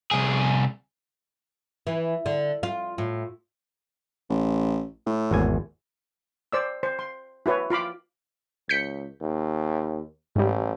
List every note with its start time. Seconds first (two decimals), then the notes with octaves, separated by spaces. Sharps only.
0.11 C2 G#4
1.87 E3
2.26 D3
2.63 F4
2.98 A2
4.29 A1
5.06 A2
5.31 G#1 E2 G#5
6.52 C5 D5 E6
6.83 C5
6.99 C6
7.46 E4 F#4 B4 C#5
7.70 F4 F5 B5 D6
8.69 C#2 G6 B6 C#7
9.21 D#2
10.36 A1 G#2 G3